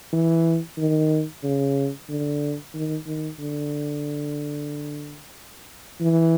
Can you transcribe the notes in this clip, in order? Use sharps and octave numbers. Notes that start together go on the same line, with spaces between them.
E3
D#3
C#3
D3
D#3
D#3
D3
E3